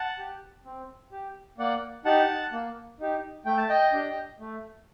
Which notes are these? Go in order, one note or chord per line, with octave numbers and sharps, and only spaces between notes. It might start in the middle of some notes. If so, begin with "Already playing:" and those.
Already playing: F#5 A5
G4
C4
G4
A#3 D5 F#5
D#4 G4 F#5 A5
A#3
D#4 G4
A3 G5
A5
D#5 G5
D4 G4
A3